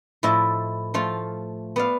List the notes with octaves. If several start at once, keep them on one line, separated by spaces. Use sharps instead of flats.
A2 F3 E4 D#5 E5 A5
F3 A3 F4 F5
B3 D5 F5